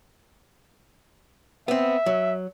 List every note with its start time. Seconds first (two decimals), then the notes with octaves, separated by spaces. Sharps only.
1.68 B3 C4 E5
2.06 F#3